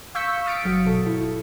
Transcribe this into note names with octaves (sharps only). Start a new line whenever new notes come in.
F5 C#6 E6 G6 B6 C#7
D#6 F6 A6 B6 C#7 D7
G1 F#3 F#4
G#1 B2 A4
E4